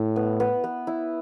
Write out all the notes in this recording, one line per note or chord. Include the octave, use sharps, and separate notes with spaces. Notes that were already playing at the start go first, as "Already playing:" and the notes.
Already playing: A2 E4
B3
B3
B3
E4